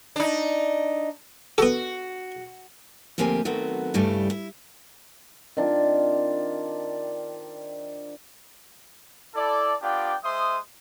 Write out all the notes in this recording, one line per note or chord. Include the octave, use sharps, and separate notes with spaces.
D4 D#4
B3 F#4 A4
D2 F3 A#3 C4 G4 G#5
D#3 F#3 A3 B3 C4 F#4
G2 C#3 G3 A3 E4 G4
E4
D#3 C4 D4 F4
E4 A4 D5
B3 D4 F4 G4 D5 G5
G#3 C5 E5 C6 D#6